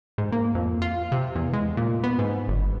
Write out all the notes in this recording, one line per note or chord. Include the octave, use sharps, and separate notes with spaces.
G#2
A#3
F2
F4
C3
E2
G#3
A#2
B3
G#2
G1